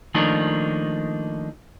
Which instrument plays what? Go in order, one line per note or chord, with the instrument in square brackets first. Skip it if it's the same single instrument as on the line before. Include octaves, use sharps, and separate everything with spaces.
[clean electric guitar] D#3 F3 A3 A#3 D4 D#4